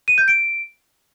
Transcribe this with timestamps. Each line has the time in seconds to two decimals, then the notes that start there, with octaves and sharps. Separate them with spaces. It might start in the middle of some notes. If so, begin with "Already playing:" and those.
0.08 D#7
0.18 G6
0.28 D7